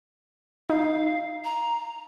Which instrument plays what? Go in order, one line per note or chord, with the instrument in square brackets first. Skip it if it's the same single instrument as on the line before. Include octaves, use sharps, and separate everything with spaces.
[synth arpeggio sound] D#4 [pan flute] F5
[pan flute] A#5